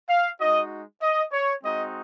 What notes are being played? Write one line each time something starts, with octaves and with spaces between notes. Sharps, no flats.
F5
G#3 D#4 F#4 D#5
D#5
C#5
G#3 C4 D#4 F#4 D#5